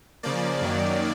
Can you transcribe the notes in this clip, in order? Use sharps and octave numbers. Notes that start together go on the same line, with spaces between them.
C#3 F3 A#3 D5
F#2 D#3 F#3 A#3